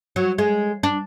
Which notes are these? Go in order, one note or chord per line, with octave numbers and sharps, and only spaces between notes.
F#3
G#3
D4